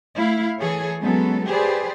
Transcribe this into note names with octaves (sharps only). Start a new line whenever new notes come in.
A3 E4 F5
E3 G#4 A4 C#5
F#3 G#3 B3 C#4 A4
G4 G#4 B4 C5 D5